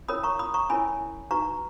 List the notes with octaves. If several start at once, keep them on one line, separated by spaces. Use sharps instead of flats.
C#4 E4 A#4 C#5 B5 D#6
A#5 C#6
B5 D#6
A#5 C#6
C#4 E4 A#4 C#5 G#5 B5
D#4 F#4 B4 A#5 C#6